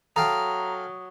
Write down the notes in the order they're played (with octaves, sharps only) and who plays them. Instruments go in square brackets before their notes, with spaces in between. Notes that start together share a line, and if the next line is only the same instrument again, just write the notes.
[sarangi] F#3 [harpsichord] A4 F5 G5 [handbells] A#5 [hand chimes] D#6